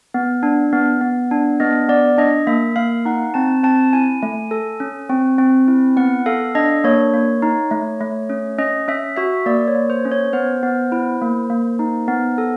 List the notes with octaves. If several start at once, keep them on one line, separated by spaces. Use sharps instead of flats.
B3
D4
B3
B3
D4
B3 D#5
B3 D5
D4 D#5
A#3 E5
A#3 F5
D#4 F#5
C4 A5
C4 A5
E4 G#5
A3
A4
C#4
C4
C4
E4
B3 F#5
A4 F5
D4 D#5
A#3 C#5
A#3
D#4
A3
A3
C#4
C#4 D#5
C#4 E5
F#4 E5
A#3 D5
C#5
A#3
C5
C#4
C#5
B3 C5
B3
E4
A#3
A#3
D#4
B3
A4